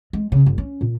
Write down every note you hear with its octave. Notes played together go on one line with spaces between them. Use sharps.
G#3
C#3
G1
C#4
A#2